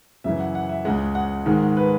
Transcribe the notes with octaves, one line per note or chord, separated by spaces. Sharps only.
F#2 C#3 E3 E5
F#5
F#5
E5
C#2 C#3 G#3 F#5
F#5
G#2 D#3 G#3
B4